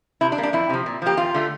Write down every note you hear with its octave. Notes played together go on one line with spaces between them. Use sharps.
C3 E4
D4
G3 A#3
D4
F2 E4
C3 F3
A#2
F3 A#3 G4
E2 F4
D3 A3